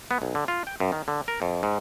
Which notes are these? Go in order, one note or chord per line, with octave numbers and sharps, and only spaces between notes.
B3
B1
D3
F4
G5
F#2
D#3
D3
A#4
F2
G#2